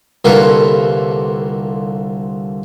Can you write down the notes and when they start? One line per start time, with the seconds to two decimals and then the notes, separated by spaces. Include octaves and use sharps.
0.25 C2 D3 A#3 F4 A4 B4